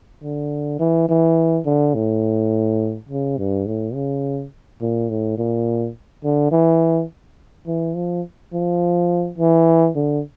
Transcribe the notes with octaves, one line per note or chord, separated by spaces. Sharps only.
D3
E3
E3
D3
A2
C#3
G2
A2
C#3
A#2
A2
A#2
D3
E3
E3
F3
F3
E3
D3